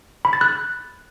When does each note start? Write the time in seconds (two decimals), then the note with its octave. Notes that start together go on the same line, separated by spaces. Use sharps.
0.25 B5
0.33 A6
0.41 F#6